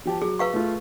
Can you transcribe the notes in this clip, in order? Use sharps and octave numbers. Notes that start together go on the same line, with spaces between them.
F3 G4 A5
F#3 G#4
B4 F5 C#6
A3 F4